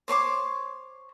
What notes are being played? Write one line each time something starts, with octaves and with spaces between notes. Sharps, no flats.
C5 C#5 C6 D6